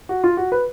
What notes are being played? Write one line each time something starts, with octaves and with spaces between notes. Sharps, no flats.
F#4
F4
F#4
B4